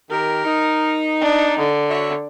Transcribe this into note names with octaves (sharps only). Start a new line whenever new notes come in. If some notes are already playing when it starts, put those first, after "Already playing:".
D#3 G4 A#4
D#4
D4
D3
F#4 C#5 E5